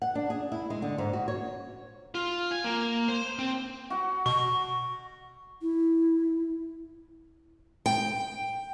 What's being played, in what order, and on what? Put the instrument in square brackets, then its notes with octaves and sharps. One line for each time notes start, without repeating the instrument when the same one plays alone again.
[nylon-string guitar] F#5
D4
G#4
E4
G#3
D3
G#2
F#4
C#5
[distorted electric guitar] F4
G#5
A#3
C5
C4
[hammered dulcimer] F#4 F#5
[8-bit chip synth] B2 [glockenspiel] C#6
[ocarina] E4
[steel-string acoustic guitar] G5